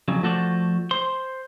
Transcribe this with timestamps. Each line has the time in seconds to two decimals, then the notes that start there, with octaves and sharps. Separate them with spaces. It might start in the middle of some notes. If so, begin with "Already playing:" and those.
0.08 F2 C#3 F#3
0.23 F3 A3 F#4 A4 C5 D5
0.91 C5 C6